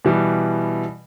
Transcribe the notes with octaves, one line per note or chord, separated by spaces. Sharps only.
B2 E3 G3